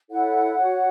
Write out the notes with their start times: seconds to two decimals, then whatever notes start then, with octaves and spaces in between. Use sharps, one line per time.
0.10 E4 A4 C#5 F#5
0.56 F#4 C#5